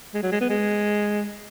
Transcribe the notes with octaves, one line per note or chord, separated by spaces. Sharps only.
G#3
F#3
G#3
B3
G#3